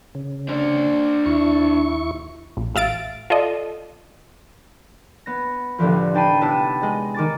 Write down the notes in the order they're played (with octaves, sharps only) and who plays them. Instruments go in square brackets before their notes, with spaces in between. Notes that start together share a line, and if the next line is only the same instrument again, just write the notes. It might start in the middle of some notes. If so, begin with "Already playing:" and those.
[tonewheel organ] C#3
[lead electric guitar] D4 C5
[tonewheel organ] D#2 E4 C#6
[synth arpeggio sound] A#1
A1 E5 F5 A6 D7
F4 A4 D5 D#5
[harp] B3 A#6
C2 A2 D3 E3 F3
D#4 G5 A5 B5 C7 D#7
C3 B3 E4 A5 E6 D#7
G#3 D#5
D#3 D6 A6